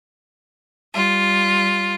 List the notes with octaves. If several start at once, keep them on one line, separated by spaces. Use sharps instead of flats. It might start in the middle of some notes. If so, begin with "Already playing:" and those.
G3 F4